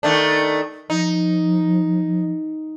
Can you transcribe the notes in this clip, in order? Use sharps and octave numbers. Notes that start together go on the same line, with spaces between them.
D#3 A3 D4
F3 D#4